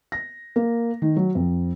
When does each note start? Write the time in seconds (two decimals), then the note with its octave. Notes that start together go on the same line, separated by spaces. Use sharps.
0.12 A#6
0.56 A#3
1.02 D#3
1.17 F#3
1.35 F2